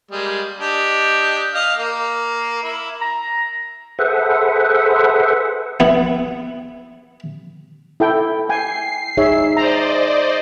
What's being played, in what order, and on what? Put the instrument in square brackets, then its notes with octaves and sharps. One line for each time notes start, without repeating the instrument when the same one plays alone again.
[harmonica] G3 G#3 A#3
D4 G4 D#5
D#5 F5
A#3
E4
[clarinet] A#5
[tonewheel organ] G#4 A4 B4 C5 E5 F#5
[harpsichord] B3 E4
[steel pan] E4 A4 G5
[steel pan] G5 G#5 [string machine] C7
[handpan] D#4 G#4 E5 [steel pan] C#5
[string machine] C5 D5 D#5 [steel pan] A#5